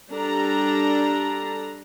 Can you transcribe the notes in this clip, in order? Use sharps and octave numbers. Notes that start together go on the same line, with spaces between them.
G3 D4 A4 A#5